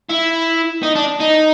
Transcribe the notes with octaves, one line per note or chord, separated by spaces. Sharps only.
E4
D#4
D4
D#4